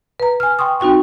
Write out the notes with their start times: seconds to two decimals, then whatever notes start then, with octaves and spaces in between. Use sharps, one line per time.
0.20 B4 A#5
0.40 G#5 F6
0.59 G5 C6 C#6 D#6
0.80 C4 D#4 F#4 G5 C#6